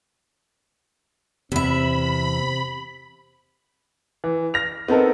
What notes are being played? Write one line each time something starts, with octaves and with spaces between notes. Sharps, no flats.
E2 C3 C4 E5 B5
E3
F6 A#6 F7
B3 C4 D#4 A4 A#4